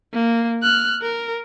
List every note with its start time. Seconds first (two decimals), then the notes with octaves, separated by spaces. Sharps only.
0.14 A#3
0.63 F6 F#6
1.02 A#4